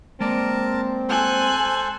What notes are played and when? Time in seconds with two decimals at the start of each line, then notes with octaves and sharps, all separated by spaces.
0.20 G#3 A#3 C4 A#4 D5 A5
1.09 A4 C5 G#5 F#6 G#6